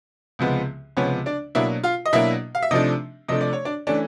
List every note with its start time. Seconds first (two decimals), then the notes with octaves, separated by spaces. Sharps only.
0.39 C#2 C3 F3 G#3 B3
0.97 C#2 C3 F3 G#3 B3 C#4 C#5
1.26 D4 D5
1.55 B2 F#3 A#3 D4 E4 E5
1.84 F4 F5
2.06 D#5
2.13 B2 F#3 A#3 D4 E4 E5
2.55 F5
2.63 E5
2.71 C3 F3 A3 D4 D#4 D#5
3.28 C3 F3 A3 D4 D#5
3.41 D5
3.53 C#5
3.65 D4 D5
3.87 E3 A3 C#4 D4 D5